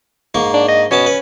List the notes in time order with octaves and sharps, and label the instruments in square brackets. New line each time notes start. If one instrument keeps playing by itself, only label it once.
[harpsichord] G#2 A#3 C#6
[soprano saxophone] D4
D#5
[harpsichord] B2 B3 A5 [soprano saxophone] C#4
[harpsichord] B4